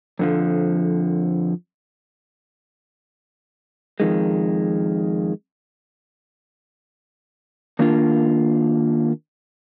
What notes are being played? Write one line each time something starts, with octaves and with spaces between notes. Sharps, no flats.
F2 D3 F3
F2 D#3 G#3
D#3 A#3 D4 F4